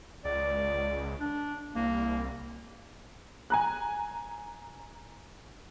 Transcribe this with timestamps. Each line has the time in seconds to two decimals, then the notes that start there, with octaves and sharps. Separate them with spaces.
0.25 C#2 D5
1.21 D4
1.76 C2 A#3
3.50 G#5 A#5 F#6